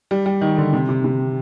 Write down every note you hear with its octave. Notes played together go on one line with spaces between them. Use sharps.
G3
G3
D#3
D3
C3
C3
C3